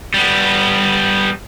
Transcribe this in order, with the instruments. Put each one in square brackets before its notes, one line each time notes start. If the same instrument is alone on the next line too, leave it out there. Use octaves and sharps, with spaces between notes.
[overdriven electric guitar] G3 B3